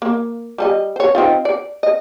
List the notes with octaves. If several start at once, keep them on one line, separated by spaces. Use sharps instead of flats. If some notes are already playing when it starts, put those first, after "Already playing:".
A#3
G3 A4 D#5
C5 C#5
C4 D#4 F4
D5
D#5